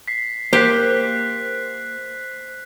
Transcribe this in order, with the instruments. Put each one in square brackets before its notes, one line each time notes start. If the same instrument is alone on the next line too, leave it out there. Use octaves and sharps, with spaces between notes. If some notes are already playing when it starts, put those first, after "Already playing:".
[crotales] B6 C7
[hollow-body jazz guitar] A#3 [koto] G4 [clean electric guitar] C5 [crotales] F#6 B6